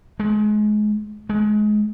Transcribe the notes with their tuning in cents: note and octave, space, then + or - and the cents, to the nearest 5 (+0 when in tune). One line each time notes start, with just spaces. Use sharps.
G#3 +25
G#3 +25